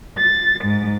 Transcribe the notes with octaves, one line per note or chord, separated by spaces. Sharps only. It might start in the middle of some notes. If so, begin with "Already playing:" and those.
A6
G#2